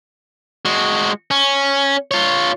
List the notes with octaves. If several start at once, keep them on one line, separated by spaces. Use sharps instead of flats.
G#3 F#4
C#4
F4 C#5